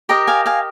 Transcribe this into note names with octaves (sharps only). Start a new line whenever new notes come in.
G4 A#4 D#5 G5 A#5
F5 G#5
F5 G#5